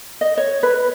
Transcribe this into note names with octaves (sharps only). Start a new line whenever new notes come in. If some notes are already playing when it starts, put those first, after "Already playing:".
D#5
C#5
B4